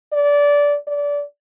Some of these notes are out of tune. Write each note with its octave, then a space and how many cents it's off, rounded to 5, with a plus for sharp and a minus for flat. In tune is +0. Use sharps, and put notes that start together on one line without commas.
D5 -20
D5 -25